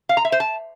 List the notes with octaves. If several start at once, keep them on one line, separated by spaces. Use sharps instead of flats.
F5
A#5
E5
C5
A5